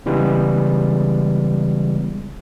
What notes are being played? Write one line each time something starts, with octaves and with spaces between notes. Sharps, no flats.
C#3 E3 G3 G#3 B3